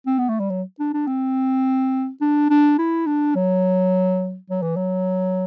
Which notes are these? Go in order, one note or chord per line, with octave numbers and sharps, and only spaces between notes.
C4
B3
A3
G3
F#3
D4
D4
C4
D4
D4
E4
D4
F#3
F#3
E3
F#3